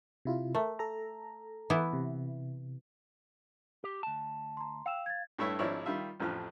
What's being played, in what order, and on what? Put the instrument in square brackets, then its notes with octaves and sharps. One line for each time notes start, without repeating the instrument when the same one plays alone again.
[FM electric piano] C3 E4 F4
[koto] A3 [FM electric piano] A#4
[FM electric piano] A4 A#5
[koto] E3 B3 E4
[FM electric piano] C3
[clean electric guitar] G4
D2 A5
[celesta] A#5 C6
[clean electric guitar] F5 [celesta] G5 E6 E7
[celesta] G#6 A6
[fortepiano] G2 A3 E4 C#5 E5
G#1 F3 D4 E4 C#5 D5
D#3 G3 F4 E5
A1 F2 F3 A3 F6